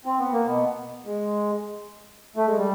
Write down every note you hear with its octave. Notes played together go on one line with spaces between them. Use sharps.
C4
B3
A#3
B2 B3
G#3
A3
G#3
G3